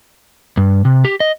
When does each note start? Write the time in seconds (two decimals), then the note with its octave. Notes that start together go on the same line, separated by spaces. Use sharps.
0.57 G2
0.85 C3
1.05 G4
1.20 D#5